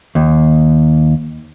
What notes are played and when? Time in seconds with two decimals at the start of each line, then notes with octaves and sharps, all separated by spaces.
0.15 D#2